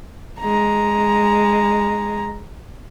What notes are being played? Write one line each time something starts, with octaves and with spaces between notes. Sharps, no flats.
G#3 A#5